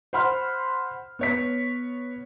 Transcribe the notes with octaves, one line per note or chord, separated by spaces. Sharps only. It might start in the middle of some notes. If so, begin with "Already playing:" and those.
C5 F#5 B5 C6 F6
B3 C#5 B6